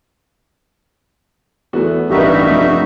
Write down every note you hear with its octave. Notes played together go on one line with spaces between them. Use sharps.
E2 A3 B3 F#4
A1 G2 D#4 F#4 G4 A#4 B4 E5
F1